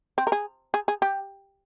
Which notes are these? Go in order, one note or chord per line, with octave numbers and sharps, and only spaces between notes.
C4
A#4
G#4
G#4
G#4
G4